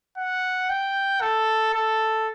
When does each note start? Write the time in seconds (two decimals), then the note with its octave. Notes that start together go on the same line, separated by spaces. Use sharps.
0.18 F#5
0.70 G5
1.21 A4
1.74 A4